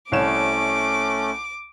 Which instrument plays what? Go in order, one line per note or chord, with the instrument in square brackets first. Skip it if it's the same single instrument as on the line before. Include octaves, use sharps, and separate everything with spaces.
[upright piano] C2 C#5 E7 [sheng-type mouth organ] A3 C#4 [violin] D6